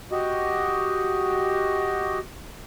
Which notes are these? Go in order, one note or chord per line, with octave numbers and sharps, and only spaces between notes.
F#4 G4 D#5